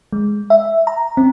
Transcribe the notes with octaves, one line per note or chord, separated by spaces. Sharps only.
G#3
E5
A#5
C4